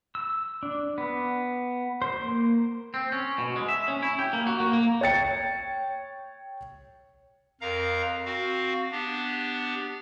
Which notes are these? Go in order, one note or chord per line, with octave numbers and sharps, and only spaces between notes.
E6
D4
B3
C5
A#3
C4
C#4
B2
G#3
E5
C#4
E4
G4
A#3
F#4
A#3
A#3
C#5 G5 A6 C#7
F2 A#4 F5 A#5
C4 F#4 F5
B3 D4 G4